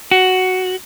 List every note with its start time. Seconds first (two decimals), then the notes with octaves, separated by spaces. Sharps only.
0.11 F#4